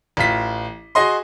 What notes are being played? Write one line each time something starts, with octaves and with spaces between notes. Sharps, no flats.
A1 F4 B6
F#4 G#4 D#5 C6